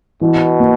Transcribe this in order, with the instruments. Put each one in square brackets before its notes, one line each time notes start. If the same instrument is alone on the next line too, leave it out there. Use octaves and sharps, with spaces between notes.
[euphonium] B2 [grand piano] E3
[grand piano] A#3